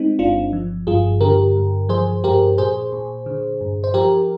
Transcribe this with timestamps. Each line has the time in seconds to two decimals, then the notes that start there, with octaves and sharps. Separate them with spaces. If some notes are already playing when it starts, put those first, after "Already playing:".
Already playing: G#3 C4 D#4
0.19 G1 D4 F4
0.53 F3
0.87 G2 F4 G#4
1.21 D3 G4 A#4
1.55 G2
1.89 F3 G#4 C5
2.24 G2 G4 A#4
2.58 A#2 G#4 C5
2.92 A#2
3.26 D3
3.61 G2
3.84 C5
3.94 F3 G4 A#4